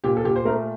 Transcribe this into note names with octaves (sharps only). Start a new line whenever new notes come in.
A#2 G4
A4
A#2 G4
C5
A3 A#4